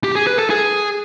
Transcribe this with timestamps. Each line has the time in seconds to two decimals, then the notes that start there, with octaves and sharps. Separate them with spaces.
0.04 G4
0.15 G#4
0.27 B4
0.39 A4
0.50 G#4